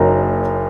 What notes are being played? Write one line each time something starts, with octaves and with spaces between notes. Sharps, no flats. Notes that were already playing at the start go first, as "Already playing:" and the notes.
Already playing: F#1 F#2 F#3 A#3 D#4